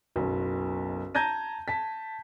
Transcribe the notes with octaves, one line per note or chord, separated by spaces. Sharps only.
F#1 B1
A5 A#5 G6 G#6 A#6 D#7
A5 B6